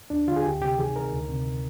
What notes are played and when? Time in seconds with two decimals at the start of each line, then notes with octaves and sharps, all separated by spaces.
0.10 D#2 D4
0.28 D3 F4
0.36 G#4
0.45 D2 G4
0.61 C3 G4
0.78 D#3 G#4
0.96 D#3 A#4
1.12 D2
1.29 C3